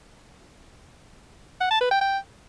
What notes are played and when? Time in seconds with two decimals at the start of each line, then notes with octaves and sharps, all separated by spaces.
1.61 F#5
1.71 A5
1.81 B4
1.91 G5
2.01 G5